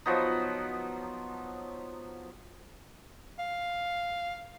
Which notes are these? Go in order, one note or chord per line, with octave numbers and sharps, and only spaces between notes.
F3 F#3 B3 D#4
F5